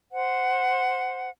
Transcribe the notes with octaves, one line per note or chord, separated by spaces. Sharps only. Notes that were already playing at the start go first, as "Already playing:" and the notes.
C5 F#5